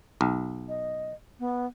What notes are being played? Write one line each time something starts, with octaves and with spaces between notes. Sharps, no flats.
B1
D#5
B3